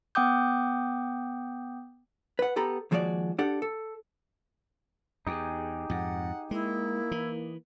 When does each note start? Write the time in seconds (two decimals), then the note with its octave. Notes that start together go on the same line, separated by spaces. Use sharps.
0.15 B3 F#5 G5 D6 D#6 G6
2.39 B4 F#5
2.56 B3 G4 A4 A#5 B5
2.91 D#2 F3 G#3 F#4 C#5 D5
3.39 D4 G4 A4 F#5
3.62 A4
5.27 E2 D#4 G4 G#4
5.90 F2 G#2 F#5
6.51 G#3 A#3 E4
7.11 E3